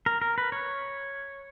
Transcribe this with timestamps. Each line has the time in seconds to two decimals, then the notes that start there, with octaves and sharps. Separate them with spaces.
0.06 A#4
0.22 A#4
0.38 B4
0.52 C#5